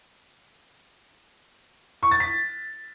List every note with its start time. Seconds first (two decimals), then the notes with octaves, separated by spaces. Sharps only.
2.03 C#6
2.11 A6
2.20 B6